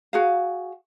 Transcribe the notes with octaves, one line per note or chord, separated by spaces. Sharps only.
F#4 G#4 F5